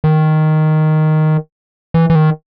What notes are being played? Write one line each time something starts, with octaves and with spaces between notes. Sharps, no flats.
D#3
E3
E3
D#3